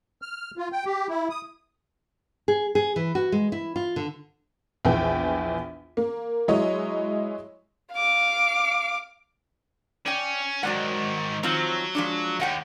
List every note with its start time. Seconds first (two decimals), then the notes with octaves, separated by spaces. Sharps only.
0.22 F6
0.57 F4
0.72 G5
0.85 G4
1.09 E4
1.30 D#6
2.48 G#4
2.75 G#4
2.96 E3
3.15 F#4
3.32 G#3
3.52 E4
3.76 F4
3.96 D3
4.85 A#1 E2 B3 G5
5.97 A#3
6.48 F#3 G#3 E4 C#5 D#5
7.93 F5 D6
10.06 C#4 D5 G5
10.63 G#2 D#3 F#3 D5 F#5
11.43 D#3 F3 F#3 C4
11.95 F3 G#3 D4
12.40 D#2 D#5 F#5 G5